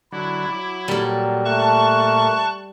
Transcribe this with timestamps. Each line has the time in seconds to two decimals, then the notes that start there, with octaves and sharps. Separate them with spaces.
0.12 D3 F#3 E4
0.52 F#3 D6
0.88 A#2 G3 A4
1.45 A3 A5 C#6 F#6